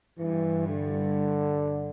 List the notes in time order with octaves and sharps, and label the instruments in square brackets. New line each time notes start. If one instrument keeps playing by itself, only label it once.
[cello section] G2 [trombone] E3
[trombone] D3